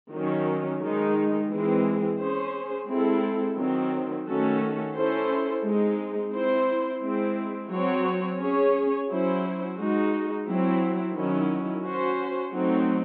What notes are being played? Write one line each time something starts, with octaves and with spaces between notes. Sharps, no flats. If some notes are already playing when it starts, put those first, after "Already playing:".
D#3 F#3 C#4
D#3 G#3 D#4
E3 G#3 C4
C#4 G#4 C5
G#3 C4 E4 A4
D#3 F#3 C4
D#3 A3 C#4 F#4 A4
C#4 E4 A4 C5
G#3 C4 D#4
C4 E4 C5
G#3 C4 E4
F#3 C4 F#4 C#5
C#4 G#4 C#5
F#3 C#4 E4 C5
G#3 D#4 F#4
F#3 C4 E4
D#3 F#3 C#4 E4
C#4 F#4 C5
F#3 A3 C4 D#4 F#4